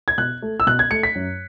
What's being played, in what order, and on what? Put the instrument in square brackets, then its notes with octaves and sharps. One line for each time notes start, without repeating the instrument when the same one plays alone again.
[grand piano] G#6
B2 F#6
A3
E6
B2 F#6
G#6
A3 C#7
B6
F#2